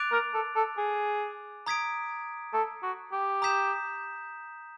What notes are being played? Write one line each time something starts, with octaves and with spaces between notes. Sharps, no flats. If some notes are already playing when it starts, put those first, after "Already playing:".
Already playing: D6 F#6 A6 D7 F7
A#4
A4
A4
G#4
A#5 D#6 G#6 B6 D7
A4
F#4
G4
A#5 D#6 G6 B6 E7